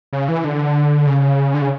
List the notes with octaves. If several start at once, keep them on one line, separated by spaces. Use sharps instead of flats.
C#3
E3
D3
C#3
D3
C#3